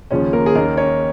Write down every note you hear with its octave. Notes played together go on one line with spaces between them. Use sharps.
D#2 C#3 F3 C#4 C#5
A#3 A#4
G#4
D#2 D#3 A#3 C#4 A#4
C#4 C#5